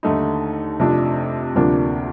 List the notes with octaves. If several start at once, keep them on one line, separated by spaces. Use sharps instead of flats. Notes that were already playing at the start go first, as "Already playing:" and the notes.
D#2 D3 A3 D#4
F2 C3 F3 A3 D4
D2 C3 F3 A#3 D4